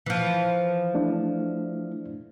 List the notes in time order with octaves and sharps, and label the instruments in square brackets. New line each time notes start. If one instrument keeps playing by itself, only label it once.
[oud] E3 F3
[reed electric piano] A3 D4 E4